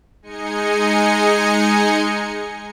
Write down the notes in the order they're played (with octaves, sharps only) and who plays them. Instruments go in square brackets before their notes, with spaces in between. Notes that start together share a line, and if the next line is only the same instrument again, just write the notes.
[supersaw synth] G#3 D#4 D#5 G#5 C#7